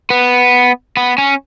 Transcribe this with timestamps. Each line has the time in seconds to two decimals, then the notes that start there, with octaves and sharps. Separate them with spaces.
0.10 B3
0.97 B3
1.18 C#4